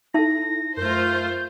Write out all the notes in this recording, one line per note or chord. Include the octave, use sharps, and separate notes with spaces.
D#4 E4 A4 E5 A5 A#6
F#2 A3 F4 A#4 C5 G6